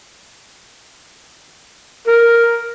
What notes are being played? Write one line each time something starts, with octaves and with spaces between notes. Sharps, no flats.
A#4